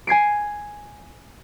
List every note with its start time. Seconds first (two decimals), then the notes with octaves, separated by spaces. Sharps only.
0.07 G#5 G#6 C7 D7